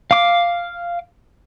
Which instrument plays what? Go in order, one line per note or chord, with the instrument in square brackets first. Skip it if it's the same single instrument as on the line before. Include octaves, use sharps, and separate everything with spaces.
[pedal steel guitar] F5 D6